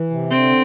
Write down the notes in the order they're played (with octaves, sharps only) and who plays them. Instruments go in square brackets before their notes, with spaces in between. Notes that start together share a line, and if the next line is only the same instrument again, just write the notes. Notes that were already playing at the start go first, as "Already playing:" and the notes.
Already playing: [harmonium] E3
C3
[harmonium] D3 [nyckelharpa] C4